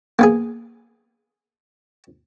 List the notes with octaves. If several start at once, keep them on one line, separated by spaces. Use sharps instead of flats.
A#3 B3 G#4